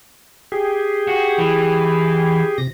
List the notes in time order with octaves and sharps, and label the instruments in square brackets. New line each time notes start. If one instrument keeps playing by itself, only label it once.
[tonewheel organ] G4 G#4
[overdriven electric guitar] F#4
E3
[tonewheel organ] C3 A#6